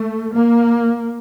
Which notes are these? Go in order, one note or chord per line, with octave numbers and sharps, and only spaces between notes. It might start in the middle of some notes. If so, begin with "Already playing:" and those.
Already playing: A3
A#3